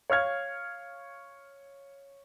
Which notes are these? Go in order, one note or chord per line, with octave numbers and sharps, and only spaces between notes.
C#5 F5 F6 G#6